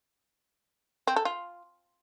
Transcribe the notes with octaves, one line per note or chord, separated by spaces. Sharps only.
C4
A4
F4